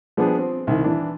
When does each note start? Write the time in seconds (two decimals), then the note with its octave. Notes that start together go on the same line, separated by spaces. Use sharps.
0.17 F3 G3 B3 D4 G4 G#4
0.39 C4
0.67 C2 D#3
0.84 E3 D4